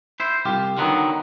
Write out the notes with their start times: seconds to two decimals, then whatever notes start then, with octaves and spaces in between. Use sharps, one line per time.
0.20 E4 C5
0.45 C2 F4 G4
0.78 D3 D#3 F#3 B3